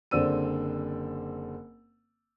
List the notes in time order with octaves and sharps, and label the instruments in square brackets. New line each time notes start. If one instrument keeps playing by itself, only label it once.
[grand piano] F#1 D3 C4 D5 E6 D#7